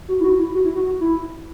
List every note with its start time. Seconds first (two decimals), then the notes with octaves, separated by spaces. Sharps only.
0.08 F#4
0.20 E4
0.24 F#4
0.39 E4
0.55 F#4
0.64 E4
0.75 F#4
0.86 F#4
1.01 E4